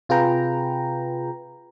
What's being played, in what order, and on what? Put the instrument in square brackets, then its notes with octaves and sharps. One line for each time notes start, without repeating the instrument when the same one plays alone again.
[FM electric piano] C3 F4 G#4 B4 G5 A#5